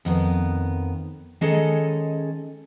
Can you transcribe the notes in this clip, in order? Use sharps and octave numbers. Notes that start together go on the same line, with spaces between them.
F2 D#3 B3
D#3 G#3 C#4 G#4 A4 D#5